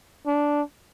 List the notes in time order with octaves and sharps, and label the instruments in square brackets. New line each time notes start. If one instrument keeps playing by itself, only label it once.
[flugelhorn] D4